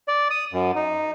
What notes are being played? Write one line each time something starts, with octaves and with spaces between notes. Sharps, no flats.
D5
D#6
F#2
D#4